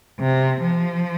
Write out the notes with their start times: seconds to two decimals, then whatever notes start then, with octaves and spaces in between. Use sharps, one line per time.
0.19 C3
0.61 F3